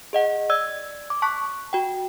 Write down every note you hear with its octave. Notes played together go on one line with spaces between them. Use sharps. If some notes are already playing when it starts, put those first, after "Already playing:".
G#4 D#5 F#5
D5 E6 G#6
D6
A5 C#6 F#6 B6
F#4 G5